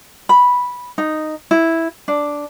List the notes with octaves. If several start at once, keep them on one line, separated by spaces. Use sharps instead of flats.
B5
D#4
E4
D4